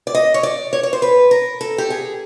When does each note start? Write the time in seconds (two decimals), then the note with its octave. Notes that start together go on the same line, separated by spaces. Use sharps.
0.07 D5
0.15 D#5
0.34 C#5
0.43 D5
0.73 C#5
0.83 C#5
0.93 C5
1.02 B4
1.31 A#4
1.61 A4
1.78 G4
1.90 G#4